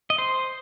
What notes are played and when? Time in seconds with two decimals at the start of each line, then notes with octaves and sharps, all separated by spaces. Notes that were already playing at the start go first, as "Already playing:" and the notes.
0.10 D#5
0.18 C5